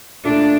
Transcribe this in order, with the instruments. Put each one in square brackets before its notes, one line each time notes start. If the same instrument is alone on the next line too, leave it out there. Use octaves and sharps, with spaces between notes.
[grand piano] A#2 A3 E4 [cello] D4